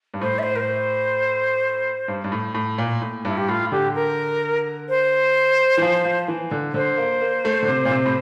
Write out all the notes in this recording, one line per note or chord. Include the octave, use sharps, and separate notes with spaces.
G2
A2 C5
E5
C5
A#4
C5
G2
G2
A2
A2
A#2
A2
G2 E4
G4
A2 F4
D3 G4
A#4
C5
E3
F3
F3
E3
D3
D3 C5
A#3
A#3
A3
D3
C3
A#2
C3
A2